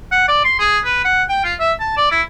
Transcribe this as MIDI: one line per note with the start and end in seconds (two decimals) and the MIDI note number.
0.11 0.23 78
0.28 0.41 74
0.45 0.55 84
0.59 0.79 68
0.85 1.01 71
1.04 1.24 78
1.29 1.44 79
1.44 1.54 65
1.60 1.73 76
1.80 1.96 81
1.97 2.08 74
2.11 2.21 64